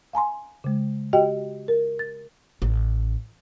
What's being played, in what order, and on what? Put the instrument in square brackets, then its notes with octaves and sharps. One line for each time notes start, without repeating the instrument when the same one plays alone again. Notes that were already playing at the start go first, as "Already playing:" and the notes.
[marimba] F5 G#5 A#5 C6
C#3 G#3
F#4 G4 D#5 G5
A#4
A6
[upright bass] A1